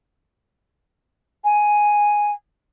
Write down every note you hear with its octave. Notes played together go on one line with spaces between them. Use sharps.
G#5